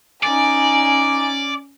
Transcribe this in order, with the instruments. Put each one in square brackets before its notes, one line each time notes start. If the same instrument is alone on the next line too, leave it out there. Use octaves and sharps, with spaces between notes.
[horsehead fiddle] C#4 [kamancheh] D#4 G#5 [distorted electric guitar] D5